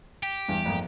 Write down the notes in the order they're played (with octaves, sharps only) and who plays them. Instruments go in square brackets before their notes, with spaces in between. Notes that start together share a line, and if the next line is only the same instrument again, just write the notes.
[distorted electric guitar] G4
[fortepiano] E2 G2
A#1 F2